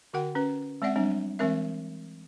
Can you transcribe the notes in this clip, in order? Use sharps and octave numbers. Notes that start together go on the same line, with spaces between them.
D3 F#4 A#4 F#5 G5
C#4 B4
G#3 C4 D5 E5 F#5
F#3 G3 C4 D4
E3 G#3 C4 A#4 E5